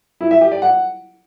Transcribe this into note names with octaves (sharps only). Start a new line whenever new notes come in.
E4
E5
G4
D5
F#5